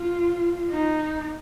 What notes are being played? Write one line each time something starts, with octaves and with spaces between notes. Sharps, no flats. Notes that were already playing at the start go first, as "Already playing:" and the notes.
Already playing: F4
D#4